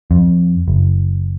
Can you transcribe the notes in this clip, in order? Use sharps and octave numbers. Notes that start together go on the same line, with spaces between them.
F2
F#1